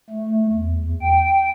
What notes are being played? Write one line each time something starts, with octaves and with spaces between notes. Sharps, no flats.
A3
E2
G5